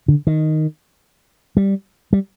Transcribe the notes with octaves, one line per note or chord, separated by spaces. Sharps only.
D3
D#3
G3
G3